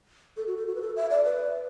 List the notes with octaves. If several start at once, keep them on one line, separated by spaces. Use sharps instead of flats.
A4
F#4
A4
F#4
B4
A4
E5
D5
B4